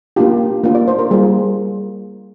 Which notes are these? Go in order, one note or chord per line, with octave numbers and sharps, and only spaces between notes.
A#3 D4 F4 G4
A#3 D4 F4
D5
C5
A#4
G3 A#3 F4 G#4